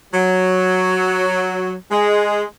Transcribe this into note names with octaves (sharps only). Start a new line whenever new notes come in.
F#3
G#3